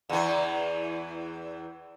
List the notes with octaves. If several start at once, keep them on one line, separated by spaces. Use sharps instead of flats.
E2 E3